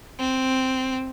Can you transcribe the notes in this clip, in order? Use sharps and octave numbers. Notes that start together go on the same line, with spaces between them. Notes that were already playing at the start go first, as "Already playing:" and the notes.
C4